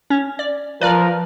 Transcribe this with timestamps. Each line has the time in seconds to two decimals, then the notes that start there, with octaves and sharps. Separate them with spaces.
0.10 C#4
0.39 D5
0.81 F3 A#4 B4 D5 F6